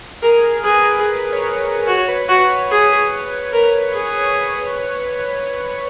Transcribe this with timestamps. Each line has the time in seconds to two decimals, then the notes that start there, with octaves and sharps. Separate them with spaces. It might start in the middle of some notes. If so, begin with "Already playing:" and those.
0.22 G#4 A#4
0.43 A#4
0.64 G#4 B4
0.84 A#4
1.05 B4
1.32 C#5
1.87 F#4 C#5
2.08 B4
2.29 F#4 B4
2.49 C#5
2.70 G#4
3.53 A#4
3.93 G#4